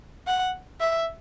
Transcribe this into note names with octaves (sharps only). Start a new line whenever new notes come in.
F#5
E5